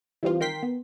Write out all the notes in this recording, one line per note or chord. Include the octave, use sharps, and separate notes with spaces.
E3 G3 C4 F4
D#3 A#4 G5 C6 B6
B3